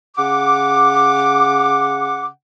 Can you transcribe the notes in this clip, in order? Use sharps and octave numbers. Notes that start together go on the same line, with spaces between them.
C#3 F#5 D6